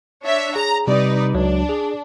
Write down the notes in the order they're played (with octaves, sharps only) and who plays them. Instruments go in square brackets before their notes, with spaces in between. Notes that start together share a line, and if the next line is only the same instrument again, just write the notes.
[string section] D4 C#5 E5
[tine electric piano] G#4 [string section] A#5
[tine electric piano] C3 G3 [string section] D#4 B4 D5
[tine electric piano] C#2 F#3 [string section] D4
[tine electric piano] G#4